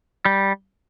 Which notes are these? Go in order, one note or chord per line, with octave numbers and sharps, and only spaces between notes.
G3